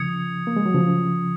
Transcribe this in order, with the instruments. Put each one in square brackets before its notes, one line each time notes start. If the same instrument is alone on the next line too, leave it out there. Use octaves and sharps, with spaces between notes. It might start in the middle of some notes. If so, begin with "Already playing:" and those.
Already playing: [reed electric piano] C#3 F3 [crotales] D#6 G#6 C#7
[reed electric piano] A#3
G#3
F#3
C#3 F3